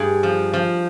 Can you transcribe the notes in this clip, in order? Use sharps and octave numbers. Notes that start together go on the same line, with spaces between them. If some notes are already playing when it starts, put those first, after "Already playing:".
Already playing: G2 G#4
F3
F3